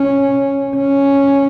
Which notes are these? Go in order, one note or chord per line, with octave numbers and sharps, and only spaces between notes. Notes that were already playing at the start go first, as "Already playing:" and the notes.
Already playing: C#4
C#4